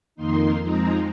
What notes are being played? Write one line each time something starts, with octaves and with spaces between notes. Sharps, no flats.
F2 D#3 A#3 D#4 C6
F2 F3 G#3 C4 D#4 A#5